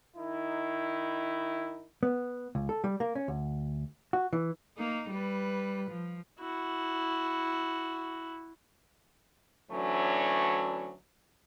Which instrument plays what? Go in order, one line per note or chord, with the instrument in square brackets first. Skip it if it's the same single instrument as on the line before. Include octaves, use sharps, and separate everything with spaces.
[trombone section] D#3 D#4 E4
[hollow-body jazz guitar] B3
C#2
A4
G3
A#3
C#4
D2
F#4
E3
[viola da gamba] A#3 D#4
G3 B4
F3
[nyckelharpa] E4 F#4
[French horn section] D2 E3 F#3 A3 C#4 D4